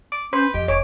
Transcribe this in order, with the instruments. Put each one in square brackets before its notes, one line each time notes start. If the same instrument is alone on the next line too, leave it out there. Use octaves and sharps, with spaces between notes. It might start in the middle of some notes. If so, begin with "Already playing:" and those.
[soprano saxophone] D6
[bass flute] C#4 [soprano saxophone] B4 [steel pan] C5
[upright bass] F2 F3 [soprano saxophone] G4 [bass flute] D#5
[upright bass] F1 [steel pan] C#5 [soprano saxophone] D6